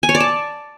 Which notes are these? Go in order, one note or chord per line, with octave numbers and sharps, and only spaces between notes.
G#5
C#5
D5
A5